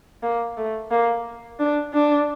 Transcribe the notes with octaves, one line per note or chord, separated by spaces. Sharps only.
A#3
A3
A#3
D4
D4